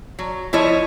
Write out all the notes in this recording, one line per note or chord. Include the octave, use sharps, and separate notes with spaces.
F#3
F3 E4 C#5 D#5